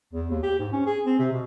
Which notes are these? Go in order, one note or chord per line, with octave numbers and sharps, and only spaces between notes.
E2
D#2
G4
G#2
C#4
G#4
C4
C3
B2